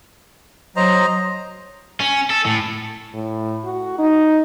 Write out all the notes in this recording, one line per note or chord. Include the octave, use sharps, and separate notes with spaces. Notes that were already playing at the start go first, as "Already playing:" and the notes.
F#3 C5 D#5 A#5
C#4
A4
A2
A2
F#4
D#4